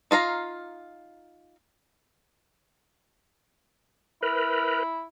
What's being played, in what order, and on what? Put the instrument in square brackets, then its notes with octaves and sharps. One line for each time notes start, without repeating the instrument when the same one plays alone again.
[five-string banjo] D#4 F4 F5 A#5
[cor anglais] E4 [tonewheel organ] A#4 B4